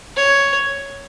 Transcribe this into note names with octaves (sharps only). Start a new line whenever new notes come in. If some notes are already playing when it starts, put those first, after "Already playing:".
C#5